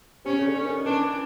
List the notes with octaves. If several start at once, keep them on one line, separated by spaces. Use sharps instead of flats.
C3 C#4
C#3
D3
C#4
D#3
E3 D4